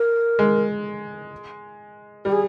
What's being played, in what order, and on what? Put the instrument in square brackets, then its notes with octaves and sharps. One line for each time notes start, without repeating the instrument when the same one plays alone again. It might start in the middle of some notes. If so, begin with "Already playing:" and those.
Already playing: [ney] A#4
[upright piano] G#3
[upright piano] G3 [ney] G4
[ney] G#4